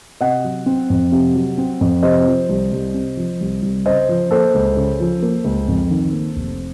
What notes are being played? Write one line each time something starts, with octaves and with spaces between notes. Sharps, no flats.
C3 D#5 F#5
F#3
C4
F2
C3
F#3
C4
F2
C3 C5 D#5
F3
C2
C2
C3
F3
C2
C2
C#3 C5 D#5
F3
A#3 A4 C5
C#2
C#3
F3
A#3
C#2
F2
D#3
A#3
F1